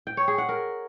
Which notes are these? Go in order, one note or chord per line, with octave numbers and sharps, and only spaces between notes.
G5
C#5
G#4
F#5
A#4